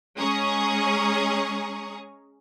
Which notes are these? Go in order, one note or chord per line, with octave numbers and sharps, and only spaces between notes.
G#3 C#4 G#4 A#5 C#6 D#6